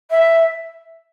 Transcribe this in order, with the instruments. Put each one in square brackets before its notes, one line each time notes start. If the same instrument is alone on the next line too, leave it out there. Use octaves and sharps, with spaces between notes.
[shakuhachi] E5